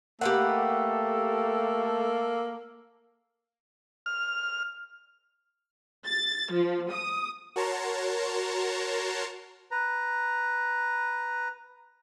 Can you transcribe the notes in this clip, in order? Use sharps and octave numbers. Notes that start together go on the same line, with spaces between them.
A3 A#3 G4 A4 B4 F#5
F6
A6
F3
D#6
F#4 A#4 C#5 A5 A#5 C6
B4 A#5